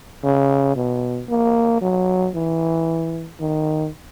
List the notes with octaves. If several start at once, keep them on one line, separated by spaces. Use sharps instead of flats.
C#3
B2
A#3
F#3
E3
D#3